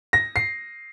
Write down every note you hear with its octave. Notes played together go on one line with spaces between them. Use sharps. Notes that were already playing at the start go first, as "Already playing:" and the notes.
A#6
C7